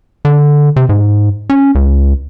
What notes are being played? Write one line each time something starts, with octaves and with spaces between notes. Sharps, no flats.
D3
C3
G#2
C#4
C#2